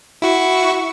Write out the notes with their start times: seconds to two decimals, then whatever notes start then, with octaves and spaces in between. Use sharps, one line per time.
0.22 E4 F#4 C#6